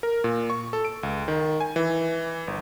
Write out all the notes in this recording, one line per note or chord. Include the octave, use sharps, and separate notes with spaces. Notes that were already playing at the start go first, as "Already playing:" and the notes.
A#4
A#2
C#6
A4
D7
C#2
D#3
G#5
E3
G1